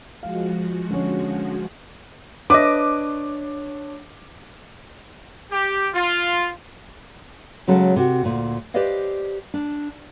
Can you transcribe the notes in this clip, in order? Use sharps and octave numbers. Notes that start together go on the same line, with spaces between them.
F3 G#3 F#4 F5
D3 C#4
D4 B4 C#5 D#5 D6
G4
F4
C#3 F#3 G#3 C#4 A4
C3 F#4
D2 A#2
G4 B4 C5 D5 D#5 F5
D4